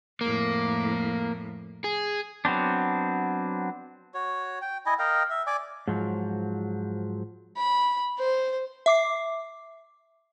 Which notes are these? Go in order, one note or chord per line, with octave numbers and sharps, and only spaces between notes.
F2 A2 A#3
G#4
F#3 B3 C4 D4
F#4 C#5
G5
E4 D#5 G#5
A#4 D#5 F5 G5
E5
D5 G#5 D6
G#2 F3 F#3
B5
C5
E5 D6 C7